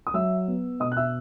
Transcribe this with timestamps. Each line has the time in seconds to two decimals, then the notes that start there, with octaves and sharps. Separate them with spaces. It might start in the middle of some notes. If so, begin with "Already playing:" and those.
0.07 D#6
0.14 F#3 E5 E6
0.48 B3
0.80 B2 D#5 D#6
0.92 F#6
0.97 E5 E6